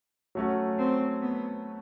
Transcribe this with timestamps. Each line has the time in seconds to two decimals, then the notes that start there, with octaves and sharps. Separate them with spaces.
0.35 F#3 A3 C#4 F#4
0.79 C4
1.23 B3